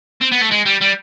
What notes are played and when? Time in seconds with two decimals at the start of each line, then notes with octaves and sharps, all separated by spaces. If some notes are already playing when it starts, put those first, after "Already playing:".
0.21 C4
0.32 B3
0.41 A3
0.51 G#3
0.65 G3
0.81 G3